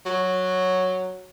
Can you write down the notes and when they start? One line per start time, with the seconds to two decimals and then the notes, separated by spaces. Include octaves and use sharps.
0.06 F#3